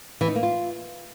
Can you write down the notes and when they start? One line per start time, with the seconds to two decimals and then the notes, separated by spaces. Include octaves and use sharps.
0.21 E3
0.28 D#4
0.35 A#3
0.43 F4